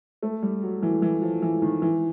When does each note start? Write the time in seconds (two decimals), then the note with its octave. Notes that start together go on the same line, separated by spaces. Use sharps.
0.23 A3
0.42 G3
0.63 F#3
0.82 E3
1.02 E3
1.22 F3
1.42 E3
1.62 D#3
1.82 E3